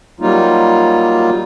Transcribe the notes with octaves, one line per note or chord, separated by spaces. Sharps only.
F#3 G3 A#3 D#4 F4